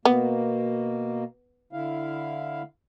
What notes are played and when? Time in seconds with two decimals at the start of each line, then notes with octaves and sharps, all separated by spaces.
0.05 B2 A#3 B3
1.73 D3 E4 F5